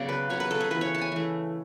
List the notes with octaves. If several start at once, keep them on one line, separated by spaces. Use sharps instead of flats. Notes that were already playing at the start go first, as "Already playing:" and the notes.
Already playing: C#3 F#3 B3 D5
B4
C#3 F#3 B3 C#5
B4
A4
G#4
E3 A3 B4
C#5
A5
G#5
E3 A3